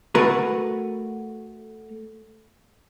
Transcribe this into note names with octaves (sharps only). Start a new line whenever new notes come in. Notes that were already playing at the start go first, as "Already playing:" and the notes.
A3 F#4 A#4 B4